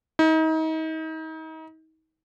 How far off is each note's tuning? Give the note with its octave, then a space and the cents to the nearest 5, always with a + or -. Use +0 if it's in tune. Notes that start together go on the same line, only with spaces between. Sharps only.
D#4 +35